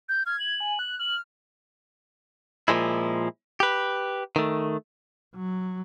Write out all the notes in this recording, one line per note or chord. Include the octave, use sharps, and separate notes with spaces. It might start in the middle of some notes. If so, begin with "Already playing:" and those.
G6
F6 G#6
F#7
G#5
F#6
F6 F#7
A#2 F3 G#3 E4
G4 B4
D#3 A3
F#3